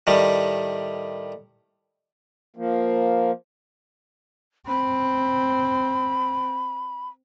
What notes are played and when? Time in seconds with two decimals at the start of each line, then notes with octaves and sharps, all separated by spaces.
0.07 A2 D#3 G3
2.56 F3 A#3
4.67 C4 B5